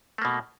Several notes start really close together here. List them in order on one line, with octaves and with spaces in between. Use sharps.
A3 A#3 B2